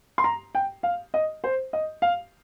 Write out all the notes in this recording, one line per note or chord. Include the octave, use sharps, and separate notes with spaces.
C6
A#5
G5
F5
D#5
C5
D#5
F5